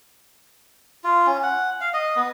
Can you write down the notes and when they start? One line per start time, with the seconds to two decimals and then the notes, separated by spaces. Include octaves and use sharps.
1.04 F4
1.27 C#4
1.43 F#5
1.81 F5
1.93 D#5
2.16 B3